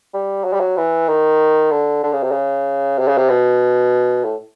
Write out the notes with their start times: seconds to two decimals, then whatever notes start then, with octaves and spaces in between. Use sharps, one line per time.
0.14 G3
0.44 F#3
0.53 G3
0.60 F#3
0.77 E3
1.09 D#3
1.71 D3
2.03 D3
2.13 C#3
2.23 C3
2.31 C#3
2.99 C3
3.08 C#3
3.18 C3
3.29 B2
4.25 A2